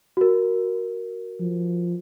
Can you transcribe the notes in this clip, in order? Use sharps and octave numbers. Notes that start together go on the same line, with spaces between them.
F#4 A#4
F3